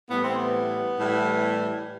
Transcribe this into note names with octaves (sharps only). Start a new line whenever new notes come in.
A2 E3 G3 B3
C4
B3
A2 E3 G3